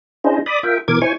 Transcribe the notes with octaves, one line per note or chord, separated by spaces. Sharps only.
C#4 D4 E4 G#4 C5 D#5
D5 B5 D6 D#6
F4 A#4 E5 G5
B2 E3 A#4 D6 G#6
E4 C5 C#5 G#5 C#6